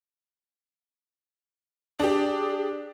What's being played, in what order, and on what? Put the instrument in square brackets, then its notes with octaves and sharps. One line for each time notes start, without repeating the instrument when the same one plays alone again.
[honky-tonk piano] D4 G4 [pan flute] G#4